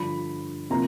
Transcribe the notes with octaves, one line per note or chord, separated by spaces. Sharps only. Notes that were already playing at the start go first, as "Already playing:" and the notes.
Already playing: G2 D3 F3 B5
C3 F3 A#3 A#5